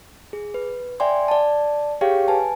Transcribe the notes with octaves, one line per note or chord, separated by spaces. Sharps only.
G#4
B4
D5 E5 G5 G#5 C6
D5 A5
G4 G#4 C#5 F5 G5
B4 G#5 A5